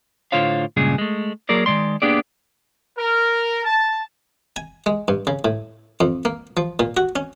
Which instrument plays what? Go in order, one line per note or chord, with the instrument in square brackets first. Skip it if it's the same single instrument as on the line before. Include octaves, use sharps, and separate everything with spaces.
[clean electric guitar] A2 D3 F4 C5 C#5 F5
G2 A#2 C#3 G#3 G#4
G#3 A3
F#3 A#3 G#4 A#4 D5
D#3 E3 G#3 D5 C6
A#3 B3 D4 G4 G#4 D5
[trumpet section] A#4
A5
[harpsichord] G#5
G#3
G2
C#3
A2
F2
A#3
F3
A#2
F#4
C#4